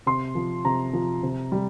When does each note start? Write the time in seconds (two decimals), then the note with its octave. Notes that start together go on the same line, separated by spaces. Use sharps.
0.06 C3 C6
0.35 F3
0.65 C3 A#5
0.93 F3
1.23 C3
1.52 G3